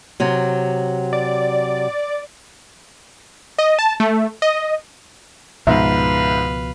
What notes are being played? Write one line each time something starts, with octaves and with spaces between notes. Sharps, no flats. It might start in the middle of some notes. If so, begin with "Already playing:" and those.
C3 F#3
D5
D#5
A5
A3
D#5
C#2 G#2 B2 F3 B4 E5 F5